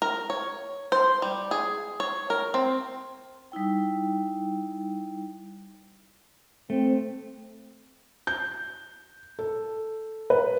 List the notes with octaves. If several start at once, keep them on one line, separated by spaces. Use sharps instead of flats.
A#4
C#5
C5
G3
G#4
C#5
A#4
C4
G3 D#4 E4 G5
A3 C4
G6
A4
B4